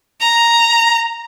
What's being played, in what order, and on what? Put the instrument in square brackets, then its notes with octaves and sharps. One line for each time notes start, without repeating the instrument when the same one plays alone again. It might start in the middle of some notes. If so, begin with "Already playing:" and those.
[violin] A#5